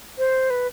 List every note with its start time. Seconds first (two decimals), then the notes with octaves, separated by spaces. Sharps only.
0.18 C5
0.50 B4